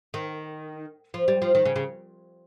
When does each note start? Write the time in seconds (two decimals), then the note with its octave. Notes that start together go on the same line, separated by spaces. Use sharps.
0.14 D#3
1.14 F3
1.28 G3
1.42 F3
1.55 D#3
1.65 C#3
1.76 C#3